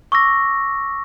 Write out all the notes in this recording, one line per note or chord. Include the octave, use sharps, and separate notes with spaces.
C#6 D6 E6 A#6